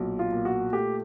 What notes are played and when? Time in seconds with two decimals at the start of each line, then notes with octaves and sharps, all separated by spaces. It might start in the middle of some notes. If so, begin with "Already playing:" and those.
Already playing: B1 A#2
0.19 F4
0.32 A#2
0.45 F#4
0.73 A3 G4